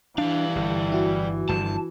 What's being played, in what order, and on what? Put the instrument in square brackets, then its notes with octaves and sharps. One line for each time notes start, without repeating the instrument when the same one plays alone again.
[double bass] E3 [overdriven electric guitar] G3 F5 [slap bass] D4
[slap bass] G1
[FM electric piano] E4 F#4
[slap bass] G1 G2 F3 [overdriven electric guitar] A5